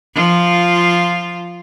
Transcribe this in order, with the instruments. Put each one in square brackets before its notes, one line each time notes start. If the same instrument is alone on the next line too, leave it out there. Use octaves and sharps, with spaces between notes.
[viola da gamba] F3 F4